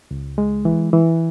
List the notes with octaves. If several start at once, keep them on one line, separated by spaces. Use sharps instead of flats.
C#2
G#3
E3
E3